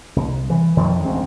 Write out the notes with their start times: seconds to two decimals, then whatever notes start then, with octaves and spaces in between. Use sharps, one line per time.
0.16 C2
0.50 E3
0.77 F2 D#3 F3 G3
1.03 A1 D2 G#3 C4